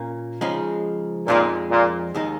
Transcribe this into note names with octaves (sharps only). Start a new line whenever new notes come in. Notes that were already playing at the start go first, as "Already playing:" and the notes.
Already playing: A#2 A#3 C#4
C#3 F3 G#3 D#4
F2 A#2 F3 G#3 D#4
A#2
D#2 D#3 G#3 D#4